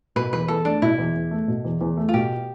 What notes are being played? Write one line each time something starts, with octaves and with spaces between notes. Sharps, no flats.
B2 B4
E2 B4
E2 A4
A3 D4
B2 E4
E2
E2
A3
B2
E2
E2
A3
F4
B2 G4